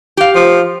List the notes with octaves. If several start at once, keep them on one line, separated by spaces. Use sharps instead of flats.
G4 F5
F3